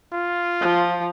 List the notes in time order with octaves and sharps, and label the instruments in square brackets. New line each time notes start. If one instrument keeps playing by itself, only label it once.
[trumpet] F4
[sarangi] F3